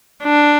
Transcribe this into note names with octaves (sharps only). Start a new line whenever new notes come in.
D4